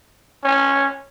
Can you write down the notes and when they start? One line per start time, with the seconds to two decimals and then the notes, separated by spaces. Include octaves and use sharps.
0.44 C#4